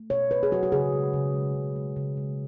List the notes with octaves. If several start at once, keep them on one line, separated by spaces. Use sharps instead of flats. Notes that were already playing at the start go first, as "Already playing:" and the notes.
Already playing: A3
B2 C#5
B2 B4
G#4
F#3 F#4
F#4
C#3 G#4
G#3
C#3
G#3
C#3
G#3
C#3
G#3